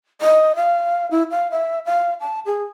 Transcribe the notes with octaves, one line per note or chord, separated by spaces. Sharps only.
D#5
F5
E4
F5
E5
F5
A5
G#4